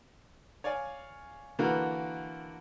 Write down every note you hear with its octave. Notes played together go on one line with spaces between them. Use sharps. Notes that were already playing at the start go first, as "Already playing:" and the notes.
C#5 D5 F5 G#5
D3 E3 A#3 F4 F#4 A#4